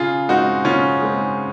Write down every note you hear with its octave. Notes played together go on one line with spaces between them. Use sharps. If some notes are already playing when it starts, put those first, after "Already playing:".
Already playing: C#3 F4 G#4
G#3 C4 D#4 F#4
C#3 C#4 F4
G#3 C4